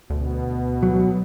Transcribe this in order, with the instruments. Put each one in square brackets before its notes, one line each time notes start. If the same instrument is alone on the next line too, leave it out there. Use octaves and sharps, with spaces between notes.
[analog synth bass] D2 [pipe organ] B2
[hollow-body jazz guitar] F#3